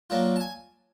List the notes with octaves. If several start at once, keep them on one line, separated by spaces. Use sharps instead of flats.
F#3 A#3 D4 F4
A5
G#5